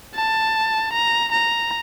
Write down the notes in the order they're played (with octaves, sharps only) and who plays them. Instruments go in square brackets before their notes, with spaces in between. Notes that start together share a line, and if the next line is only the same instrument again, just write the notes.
[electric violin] A5
A#5
A#5